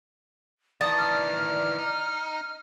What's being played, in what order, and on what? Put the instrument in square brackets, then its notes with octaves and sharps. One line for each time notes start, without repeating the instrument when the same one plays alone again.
[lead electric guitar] D#3 E3 [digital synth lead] D5 [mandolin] A5 [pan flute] D#6
[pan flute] F6
[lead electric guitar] D#4